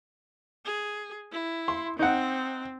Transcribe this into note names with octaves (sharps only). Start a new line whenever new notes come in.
G#4
E4
C6
C4 D#4 F#5